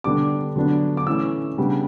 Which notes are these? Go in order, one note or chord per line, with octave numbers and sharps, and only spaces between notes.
D3 G3 B3 D4 D6
D3 F#3 B3 D4
D6
E3 A3 C#4 E6
C#3 G3 B3 D4